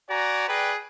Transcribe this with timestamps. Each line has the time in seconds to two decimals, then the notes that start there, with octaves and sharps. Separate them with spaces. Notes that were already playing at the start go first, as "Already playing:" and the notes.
0.10 F#4 D5 G#5 A#5
0.49 G#4 B4 D5 G5